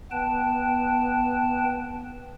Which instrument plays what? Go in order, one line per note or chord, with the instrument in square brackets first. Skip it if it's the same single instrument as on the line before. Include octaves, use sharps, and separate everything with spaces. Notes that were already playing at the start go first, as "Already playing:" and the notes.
[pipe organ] B3 B4 G5 A5